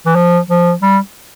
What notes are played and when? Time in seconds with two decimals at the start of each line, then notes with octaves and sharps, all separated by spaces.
0.06 E3
0.16 F3
0.50 F3
0.82 G3